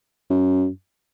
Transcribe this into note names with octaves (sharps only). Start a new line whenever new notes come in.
F#2